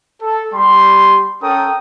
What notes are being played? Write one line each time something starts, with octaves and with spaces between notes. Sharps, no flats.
A4
G3 G4 B5 C6
C#4 A4 A#4 G5 D#6